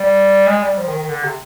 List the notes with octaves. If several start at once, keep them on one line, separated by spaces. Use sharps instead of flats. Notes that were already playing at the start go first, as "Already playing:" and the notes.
Already playing: G3
G#3
G3
F3
D#3
D#3
D3
C3